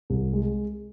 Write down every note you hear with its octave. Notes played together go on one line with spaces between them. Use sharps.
C2
G#3